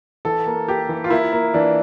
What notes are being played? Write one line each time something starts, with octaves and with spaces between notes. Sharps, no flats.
E3 A4
A#3
A#3 G4
E3
F4
A#3 E4
A#3
E3 D4